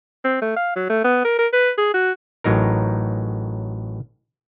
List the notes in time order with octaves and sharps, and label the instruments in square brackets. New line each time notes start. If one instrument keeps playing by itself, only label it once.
[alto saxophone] C4
A3
F5
F#3
A3
B3
A#4
A#4
B4
G#4
F#4
[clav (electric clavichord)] A1 A2 F#3 D#4 A#4